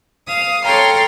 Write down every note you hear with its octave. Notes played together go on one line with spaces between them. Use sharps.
F5 D#6
A4 C#5 F5 G5 A#5 C6